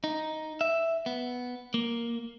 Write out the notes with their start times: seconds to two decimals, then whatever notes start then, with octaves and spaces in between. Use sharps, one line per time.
0.04 D#4
0.61 E5
1.06 B3
1.74 A#3